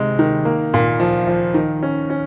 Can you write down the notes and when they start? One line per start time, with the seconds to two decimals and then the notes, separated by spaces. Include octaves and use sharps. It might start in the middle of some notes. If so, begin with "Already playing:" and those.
Already playing: C3 D#3 G#3
0.19 D#3
0.45 A#3
0.74 A#2
1.00 F3
1.27 F3
1.54 D#3
1.83 C#4
2.10 C#4